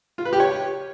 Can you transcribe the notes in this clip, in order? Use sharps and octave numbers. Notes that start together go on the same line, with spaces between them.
F4
B4
G4
C#5